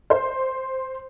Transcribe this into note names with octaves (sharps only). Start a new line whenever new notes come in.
C5